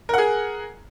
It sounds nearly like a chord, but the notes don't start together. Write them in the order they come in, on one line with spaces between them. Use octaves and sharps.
A#4 F#5 G#4